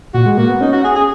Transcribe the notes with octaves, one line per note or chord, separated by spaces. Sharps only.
A#2 F#4
G#3
A#3 F#4
B3
C#4 D#4
F#4
G#4
G#4